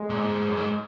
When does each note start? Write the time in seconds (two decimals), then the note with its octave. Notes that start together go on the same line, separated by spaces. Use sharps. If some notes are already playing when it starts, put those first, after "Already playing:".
Already playing: G#3
0.10 A#2
0.17 G#2
0.48 F#2
0.57 G#2